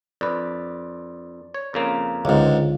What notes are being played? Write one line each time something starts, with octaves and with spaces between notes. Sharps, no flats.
F2 B4 D5
C#5
F2 C#3 A#3
C#2 G#2 D3 G#3 F4